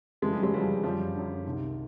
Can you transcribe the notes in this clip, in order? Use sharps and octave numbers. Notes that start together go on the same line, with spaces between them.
F2 C#3 E3 G#3
G3
F#3 G#3
F2 C#3 E3 F3 G3
F#2 D3 F3 G3
F#2 D3
C2 C3 D#3